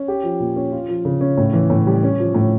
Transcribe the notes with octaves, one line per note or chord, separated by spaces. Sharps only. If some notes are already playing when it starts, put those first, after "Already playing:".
Already playing: C#4
G4
F3
A#2
C#4
F4
F3
C#3
C#4
A2
E3
A2
G3
C#4
F3
A2